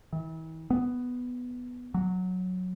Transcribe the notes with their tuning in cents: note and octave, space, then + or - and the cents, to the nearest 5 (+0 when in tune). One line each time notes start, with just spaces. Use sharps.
E3 -40
B3 +0
F#3 -10